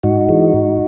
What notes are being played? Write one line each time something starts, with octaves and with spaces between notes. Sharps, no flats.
G#2 D#4 F#4
E3 G#3
G#2